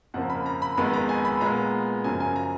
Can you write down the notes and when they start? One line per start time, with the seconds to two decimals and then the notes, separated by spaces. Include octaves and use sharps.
0.14 F2 C#3 F3 A#3 F#5
0.30 B5
0.46 A#5
0.62 B5
0.77 F2 D#3 G#3 B3 B5
0.93 A#5
1.09 G#5
1.25 B5
1.40 A#2 G#3 B3 A#5
2.04 F#2 C#3 F3 G#5
2.20 G#5
2.36 A#5